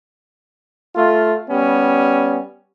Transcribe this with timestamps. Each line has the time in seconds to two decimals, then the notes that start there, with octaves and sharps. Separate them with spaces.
0.96 A3 F4
1.49 G3 B3 C#4